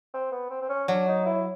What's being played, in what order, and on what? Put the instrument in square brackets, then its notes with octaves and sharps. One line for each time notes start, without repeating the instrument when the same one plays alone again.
[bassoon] C4
B3
C4
C4
C#4
[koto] F#3 [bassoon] D4
[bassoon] D#4
E4